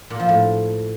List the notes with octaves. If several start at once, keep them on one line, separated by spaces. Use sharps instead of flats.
A#2
F3
A2